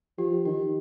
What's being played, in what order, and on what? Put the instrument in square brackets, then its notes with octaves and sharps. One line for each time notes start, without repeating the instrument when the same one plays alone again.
[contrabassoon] F3 [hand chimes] G4
[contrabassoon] D#3 [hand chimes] G4